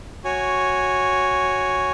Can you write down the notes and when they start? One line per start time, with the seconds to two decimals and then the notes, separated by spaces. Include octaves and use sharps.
0.24 F#4 C#5 G#5